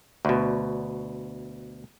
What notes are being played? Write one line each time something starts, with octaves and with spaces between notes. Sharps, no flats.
D2 B2